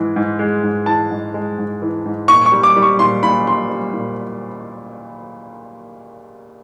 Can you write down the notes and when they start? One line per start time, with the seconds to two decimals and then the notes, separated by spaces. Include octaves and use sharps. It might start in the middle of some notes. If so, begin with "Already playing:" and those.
Already playing: G#2 E3 G#3
0.16 G#2
0.39 G#3
0.63 G#2
0.86 E3 A5
1.11 G#2
1.34 G#3
1.58 G#2
1.82 E3
2.06 G#2
2.28 A#2 C#6
2.46 C#6
2.52 G3
2.63 D6
2.76 G3
2.82 C#6
2.99 A#2 C6
3.23 A#2 B5
3.46 G3 C6
3.70 G3
3.94 A#2